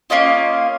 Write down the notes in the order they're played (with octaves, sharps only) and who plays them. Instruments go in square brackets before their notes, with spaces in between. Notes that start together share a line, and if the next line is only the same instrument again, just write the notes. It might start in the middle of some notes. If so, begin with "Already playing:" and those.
[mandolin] A#3 C#4 F4 D#5